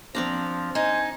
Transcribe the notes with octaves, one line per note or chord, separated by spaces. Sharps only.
F3 C4 D4 A#5
D#4 C5 G#5